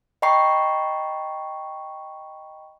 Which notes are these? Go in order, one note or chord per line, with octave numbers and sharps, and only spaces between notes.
D#5 G5 A#5 B5 C#6 C7